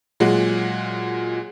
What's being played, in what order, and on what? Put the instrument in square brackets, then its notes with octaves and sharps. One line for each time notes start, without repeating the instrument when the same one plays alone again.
[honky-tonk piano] A#2 F#3 G#3 F#5